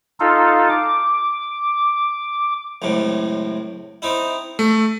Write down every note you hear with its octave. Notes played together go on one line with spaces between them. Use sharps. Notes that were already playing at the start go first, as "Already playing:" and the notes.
D#4 F4 A4
D6
C#2 F#2 A2 C3
C4 D#4 E4
A3